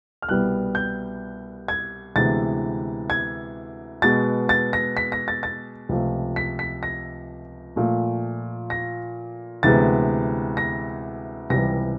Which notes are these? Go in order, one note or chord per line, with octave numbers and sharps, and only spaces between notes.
F6
C2 B2 G3 B3 F#6
G6
G#6
D2 C3 E3 G#3 B3 A6
G#6
B2 G#3 B3 A6
A6
A#6
B6
A#6
A6
A6
C#2 C3 F3 A3
B6
B6
A#6
A#2 F3 A3
A#6
D2 C3 E3 G#3 B3 A6
A#6
C#2 C3 E3 G3 A#6